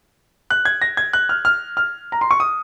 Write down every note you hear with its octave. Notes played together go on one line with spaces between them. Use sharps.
F#6
G#6
A#6
G#6
F#6
F6
F6
F6
A#5
C6
C#6
D#6